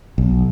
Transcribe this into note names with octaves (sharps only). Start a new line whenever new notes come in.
B1